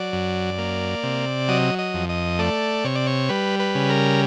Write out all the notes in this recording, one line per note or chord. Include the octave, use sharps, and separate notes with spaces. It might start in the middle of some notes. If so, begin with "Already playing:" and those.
Already playing: F#3 D5
F#2
A#3
C3
F#3 D#5
D#5
F2
D#5
A3 D5
C3 C#5
D5
C#5
G3 B4
B4
C#3
A#4